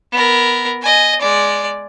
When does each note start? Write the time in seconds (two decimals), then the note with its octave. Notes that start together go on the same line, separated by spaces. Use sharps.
0.12 B3 A#4
0.82 D#5 G#5
1.21 G#3 D5